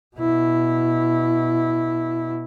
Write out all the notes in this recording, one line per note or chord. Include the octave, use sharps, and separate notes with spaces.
B2 E4